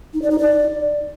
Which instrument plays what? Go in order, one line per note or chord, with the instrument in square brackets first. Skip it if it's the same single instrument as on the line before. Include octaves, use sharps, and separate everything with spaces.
[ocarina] D#4
D5
D#4
D5